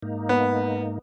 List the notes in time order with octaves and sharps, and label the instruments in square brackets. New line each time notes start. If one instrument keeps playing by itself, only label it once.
[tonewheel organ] G#2 A#3 D#4
[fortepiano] B3